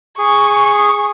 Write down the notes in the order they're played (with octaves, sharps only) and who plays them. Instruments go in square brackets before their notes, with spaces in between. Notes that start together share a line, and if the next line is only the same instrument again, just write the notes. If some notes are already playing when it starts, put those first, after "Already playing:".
[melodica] G#4 [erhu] C#6